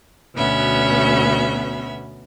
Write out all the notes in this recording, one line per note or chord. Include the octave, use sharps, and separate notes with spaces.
D2 B2 B3 C#4 E5 B5